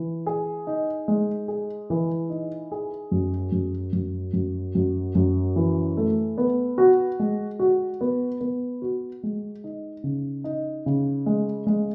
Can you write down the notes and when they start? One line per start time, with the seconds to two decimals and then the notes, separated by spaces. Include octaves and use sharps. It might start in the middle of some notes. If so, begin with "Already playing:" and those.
Already playing: E3
0.26 G#4
0.67 D#4
1.08 G#3
1.48 G#4
1.90 E3
2.30 D#4
2.72 G#4
3.11 F#2
3.52 F#2
3.93 F#2
4.33 F#2
4.75 F#2
5.15 F#2
5.56 E3
5.97 A3
6.38 B3
6.78 F#4
7.19 G#3
7.59 F#4
8.01 B3
8.41 B3
8.82 F#4
9.23 G#3
9.64 D#4
10.04 C#3
10.44 D#4
10.86 C#3
11.26 G#3
11.67 G#3